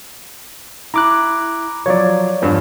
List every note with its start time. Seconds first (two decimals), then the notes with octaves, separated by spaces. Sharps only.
0.94 E4 A#5 D6 F#6
1.86 F3 F#3 C#5 D5
2.42 E2 G2 F3